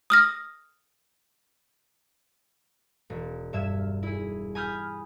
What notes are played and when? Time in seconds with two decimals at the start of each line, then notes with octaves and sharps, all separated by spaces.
0.10 D#6 F6 A#6
3.10 E1
3.53 G2 E5 G#6 E7
4.03 E4 G#4
4.55 G#5 B5 D#6 F6 G6